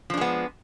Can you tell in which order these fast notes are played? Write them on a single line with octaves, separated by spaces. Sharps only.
F3 D4 G#3 B3